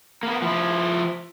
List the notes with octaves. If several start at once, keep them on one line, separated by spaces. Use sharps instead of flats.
A#3 B3
F3 E4